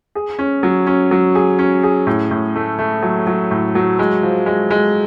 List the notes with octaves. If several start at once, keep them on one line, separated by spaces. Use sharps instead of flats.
G#4
C#4
F#3
C#4
F#3
G#4
C#4
G#4
A2
A2
A3
A3
F#3
F#3
A2
F#3
G#3
F3
G#3
G#3